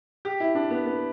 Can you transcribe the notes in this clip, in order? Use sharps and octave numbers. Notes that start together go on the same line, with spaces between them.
G4
E4
D4
B3
B3